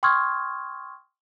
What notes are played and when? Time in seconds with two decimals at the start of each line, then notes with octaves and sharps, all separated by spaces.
0.03 G5 C6 C#6 D#6 F6 G#6